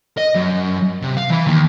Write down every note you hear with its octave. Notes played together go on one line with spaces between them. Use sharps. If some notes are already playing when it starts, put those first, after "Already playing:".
D#5
F#2
C3
F5
E3 B5
D#2